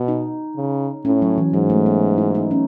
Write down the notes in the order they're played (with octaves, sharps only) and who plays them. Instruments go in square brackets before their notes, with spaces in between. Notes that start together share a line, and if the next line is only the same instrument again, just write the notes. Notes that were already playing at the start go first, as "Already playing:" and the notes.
Already playing: [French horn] B2
[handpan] D#4
[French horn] C#3
[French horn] A2 [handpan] C#4
[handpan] F#3
E3
[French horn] G#2 [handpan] F#3
[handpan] A3
B3
E4
D#4
C#4